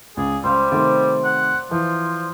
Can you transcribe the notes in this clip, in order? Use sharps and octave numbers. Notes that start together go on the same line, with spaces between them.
C#2 G#4 D5
C#2 G3 C5 E5 F5
C3 D#3 A3 C4 D5 F#5
F#5 A#5
E3 F3